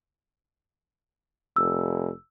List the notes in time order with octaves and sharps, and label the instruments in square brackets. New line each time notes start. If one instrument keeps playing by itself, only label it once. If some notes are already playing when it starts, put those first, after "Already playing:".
[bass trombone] F1 [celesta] E6